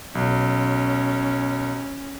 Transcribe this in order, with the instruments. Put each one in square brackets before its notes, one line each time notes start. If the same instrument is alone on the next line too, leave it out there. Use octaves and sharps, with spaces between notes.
[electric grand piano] B1 [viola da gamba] C#4